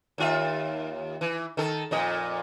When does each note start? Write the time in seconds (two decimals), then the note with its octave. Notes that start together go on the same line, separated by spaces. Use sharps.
0.18 D#2 F4 E5
1.21 E3
1.57 D#3 A4
1.91 F2 A#2 D#5